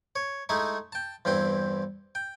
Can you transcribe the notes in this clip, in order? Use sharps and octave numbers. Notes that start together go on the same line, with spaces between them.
C#5
G#3 A3 D#4 E4 E5
G5 A5
E2 G2 C4 E4 G5
G5